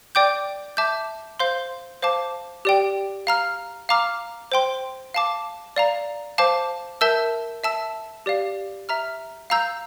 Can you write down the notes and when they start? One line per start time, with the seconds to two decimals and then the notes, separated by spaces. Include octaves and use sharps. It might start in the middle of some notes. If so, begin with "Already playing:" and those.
0.15 D5 G5 D6 G6
0.77 E5 A5 D6 G6
1.40 C5 F5 C6 G6
2.02 C5 F5 A5 D6
2.65 G4 D5 G5
3.27 F5 A#5 F6
3.89 F5 A#5 D6 F6
4.52 C5 G5 C6
5.14 F5 A5 D6
5.76 D5 F5 A#5
6.38 C5 F5 A5 D6
7.01 A#4 E5 A5 E6 G6
7.64 E5 A5 E6
8.26 G4 D5 F5
8.89 E5 A#5 F6
9.50 F5 A#5 E6 G6